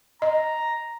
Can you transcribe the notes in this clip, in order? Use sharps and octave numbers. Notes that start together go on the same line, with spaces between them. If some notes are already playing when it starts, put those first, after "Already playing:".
D#5 A#5